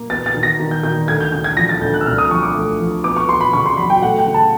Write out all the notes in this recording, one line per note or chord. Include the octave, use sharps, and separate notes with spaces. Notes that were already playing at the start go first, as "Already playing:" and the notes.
Already playing: A#3
B3 A6
A6
D#3
A#6
D#3
G6
D#3 G6
D2 G#6
G6
C#3 G6
G#6
F3 A#6
A6
D2 G6
F#6
E6
C2 F6
D#6
F3 C#6
D6
A3
F3
B3 D6
C#6
B3 C6
B5
C#3 C#6
C6
F#3 B5
G5
A3 F#5
G5
C#3
A5